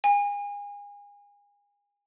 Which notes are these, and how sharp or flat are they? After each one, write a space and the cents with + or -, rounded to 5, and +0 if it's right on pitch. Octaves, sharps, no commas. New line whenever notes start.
G#5 -35